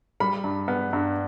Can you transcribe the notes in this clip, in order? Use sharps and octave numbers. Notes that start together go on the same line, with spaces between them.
G3 B5
G2
B3
G2